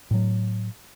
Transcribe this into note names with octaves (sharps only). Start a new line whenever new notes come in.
A2 F#3